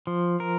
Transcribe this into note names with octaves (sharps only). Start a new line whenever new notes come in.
F3
A#4